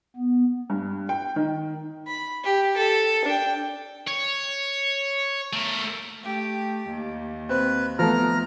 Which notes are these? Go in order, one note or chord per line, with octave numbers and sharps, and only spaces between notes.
B3
G2
G5
D#3
B5
G4
A4
D4 G5
C#5
A3 A#4
A3 G4
D#2
C4 B4
F3 A3 B3 A#5 F6